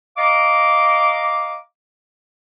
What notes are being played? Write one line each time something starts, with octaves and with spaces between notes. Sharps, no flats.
D#5 F5 A#5 D6